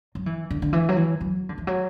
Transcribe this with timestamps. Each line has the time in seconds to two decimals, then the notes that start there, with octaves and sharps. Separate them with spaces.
0.15 F#3
0.26 E3
0.50 D3
0.62 D3
0.73 E3
0.89 F#3
0.97 E3
1.21 F#3
1.49 D3
1.58 E3
1.67 F#3